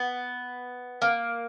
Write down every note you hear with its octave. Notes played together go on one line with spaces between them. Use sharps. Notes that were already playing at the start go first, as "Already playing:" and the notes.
Already playing: B3
A#3